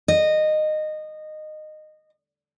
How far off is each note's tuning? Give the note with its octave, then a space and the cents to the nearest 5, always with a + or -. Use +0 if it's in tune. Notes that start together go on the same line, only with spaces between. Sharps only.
D#5 -15